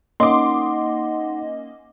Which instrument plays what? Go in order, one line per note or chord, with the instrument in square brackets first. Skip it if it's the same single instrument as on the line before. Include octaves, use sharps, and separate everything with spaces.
[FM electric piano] A#3 C#4 D#5 [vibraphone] D#4 F#5 [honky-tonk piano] C6 D6